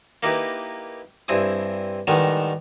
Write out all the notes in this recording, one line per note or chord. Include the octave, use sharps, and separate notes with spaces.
A#3 D#4 E4 G4 B4
G2 C4 E4 G#5 D#6
A2 D#3 G3 G#3 B3